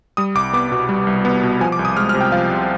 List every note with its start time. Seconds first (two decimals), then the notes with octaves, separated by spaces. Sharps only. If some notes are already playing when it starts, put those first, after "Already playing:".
0.17 G3 D#6
0.35 C2 D6
0.53 B3 D6
0.72 B2
0.89 G3
1.07 C2
1.25 B3
1.43 B2
1.60 F3 G#5
1.72 D6
1.79 C2
1.85 D#6
1.97 G#3 F6
2.09 F6
2.14 C3
2.21 G5
2.32 F3 F5
2.51 C2